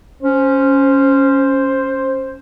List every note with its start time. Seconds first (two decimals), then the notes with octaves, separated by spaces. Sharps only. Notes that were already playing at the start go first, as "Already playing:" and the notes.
0.23 C#4 C5